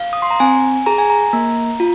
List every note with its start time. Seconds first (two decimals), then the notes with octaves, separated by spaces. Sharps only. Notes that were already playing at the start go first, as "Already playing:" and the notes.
Already playing: F5
0.13 D#6
0.22 C6
0.31 A#5
0.40 C4 G#5
0.86 G#4 A#5
0.98 G#5
1.10 A#5
1.33 A#3
1.80 F4